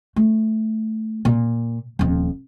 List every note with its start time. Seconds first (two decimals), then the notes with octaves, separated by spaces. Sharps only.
0.16 A3
1.25 A#2
1.99 D#1 F2